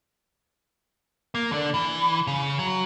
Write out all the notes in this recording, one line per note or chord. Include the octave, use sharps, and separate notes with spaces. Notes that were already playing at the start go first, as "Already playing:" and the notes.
A#3
D3 D4
E3
C#3
F#3